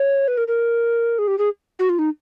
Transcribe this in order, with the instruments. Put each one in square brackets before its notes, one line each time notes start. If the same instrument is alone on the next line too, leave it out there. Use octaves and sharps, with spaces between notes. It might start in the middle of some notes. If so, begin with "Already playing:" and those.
Already playing: [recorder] C#5
B4
A#4
A#4
G#4
G4
G#4
F#4
F4
D#4